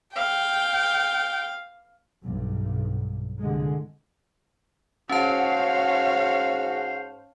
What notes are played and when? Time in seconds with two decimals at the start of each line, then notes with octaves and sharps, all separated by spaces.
0.16 F5 G5
2.23 B1 G2
3.40 C2 D3 G#3
5.09 G#2 C#4 F#4 C5 C#5 F5 A5